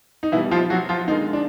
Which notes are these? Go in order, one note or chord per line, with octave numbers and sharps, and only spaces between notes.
D#4
B2 E3 G3 E4
F3 F4
F#3 F#4
F3 F4
D3 D#3 F3 G#3 D#4
D4